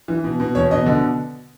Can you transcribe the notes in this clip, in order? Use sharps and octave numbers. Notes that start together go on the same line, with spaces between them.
E3
B2
B2
E2 C#5
B2 D#5
D3